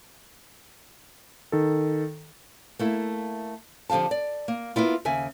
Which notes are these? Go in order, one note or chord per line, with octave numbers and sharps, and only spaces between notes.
D#3 A4
A3 A#3 E4
D3 F3 G4 F5 A5
D5
A#3
A#3 B3 E4 F4
D#2 C#3 E5 G#5